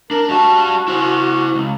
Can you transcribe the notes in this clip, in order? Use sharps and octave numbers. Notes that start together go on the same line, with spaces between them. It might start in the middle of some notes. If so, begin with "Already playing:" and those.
D4 A#4
G3 F#4 A5
E4 C5
C#2